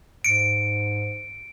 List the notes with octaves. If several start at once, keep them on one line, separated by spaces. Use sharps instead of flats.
G#2 C#7 D7